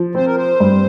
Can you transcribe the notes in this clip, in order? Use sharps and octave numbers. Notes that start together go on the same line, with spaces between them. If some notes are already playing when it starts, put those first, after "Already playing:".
Already playing: F3
C4 C5
A#4
C5
G2